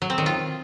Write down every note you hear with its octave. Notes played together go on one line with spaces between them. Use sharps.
F#3
C4
D#3
F4